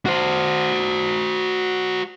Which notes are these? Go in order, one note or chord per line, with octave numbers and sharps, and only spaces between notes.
F#4 C5